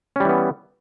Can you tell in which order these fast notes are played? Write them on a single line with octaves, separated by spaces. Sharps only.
C#4 G3 E3 B3